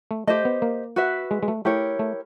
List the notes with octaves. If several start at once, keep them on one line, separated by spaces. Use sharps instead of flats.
A3
A3 G4 C5 D#5
B3
A#3
F#4 B4 E5
G#3
G#3
A3
A3 E4 G4 A#4 C#5
A3